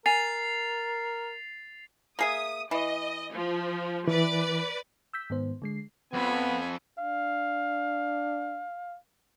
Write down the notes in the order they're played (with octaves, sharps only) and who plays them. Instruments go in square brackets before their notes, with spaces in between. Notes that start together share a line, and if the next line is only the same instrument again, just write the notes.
[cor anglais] A#4 [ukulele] G#5 [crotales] A6 C7 F7
[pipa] A#3 G#4 E5 [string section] D#6
[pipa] E3 [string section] D#5
[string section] F3
[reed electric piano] E3 [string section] B4 D5
[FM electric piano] E6 G6 B6
G#2 D#3 B3 C5
D3 G#3 C7
[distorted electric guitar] F2 [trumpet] B3 [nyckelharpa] G#5 B5
[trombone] D4 [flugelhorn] F5